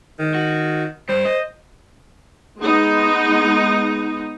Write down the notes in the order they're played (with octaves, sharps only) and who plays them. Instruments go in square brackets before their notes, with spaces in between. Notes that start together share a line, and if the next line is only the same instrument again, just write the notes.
[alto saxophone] D#3
[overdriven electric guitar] F#4
[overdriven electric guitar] G2 G3 [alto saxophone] C5
[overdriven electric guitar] D#5
[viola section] G#3 B3 D#4